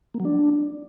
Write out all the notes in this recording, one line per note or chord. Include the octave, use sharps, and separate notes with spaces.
A#3
F#3
D4